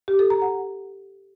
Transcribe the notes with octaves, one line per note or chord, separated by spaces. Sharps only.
G4
A4
A#5
F#5